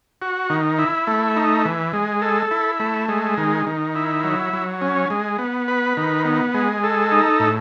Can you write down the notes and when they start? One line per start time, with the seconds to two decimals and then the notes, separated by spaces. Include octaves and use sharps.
0.22 F#4
0.50 D#3
0.79 E4
1.07 A3
1.36 D#4
1.65 E3
1.93 G#3
2.22 A4
2.51 E4
2.80 A3
3.08 G#3
3.38 D#3
3.67 D#3
3.96 E4
4.24 F#3
4.53 F#3
4.81 C#4
5.10 G#3
5.38 B3
5.68 B4
5.97 D#3
6.25 B3
6.54 G#3
6.83 A4
7.12 D#4
7.40 A2